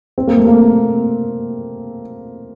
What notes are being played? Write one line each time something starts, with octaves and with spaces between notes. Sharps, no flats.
C4
A#3
A3
A#3